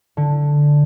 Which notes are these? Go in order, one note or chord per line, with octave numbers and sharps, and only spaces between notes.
D3